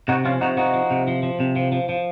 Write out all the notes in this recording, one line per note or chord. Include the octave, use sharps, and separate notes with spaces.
C3 D#4 F#4
F3 C#4 F4
C3 D#4 F#4
F3 D#4 F#4
F3
C3
F3
F3
C3
F3
F3
F3